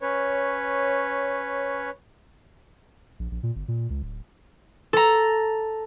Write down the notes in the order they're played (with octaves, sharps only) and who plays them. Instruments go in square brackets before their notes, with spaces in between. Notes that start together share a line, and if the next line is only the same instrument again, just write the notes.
[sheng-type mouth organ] C#4 B4 C#5
[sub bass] A#1
A#1
A#2
G1
A#2
C#2
D1
[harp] A4 A#5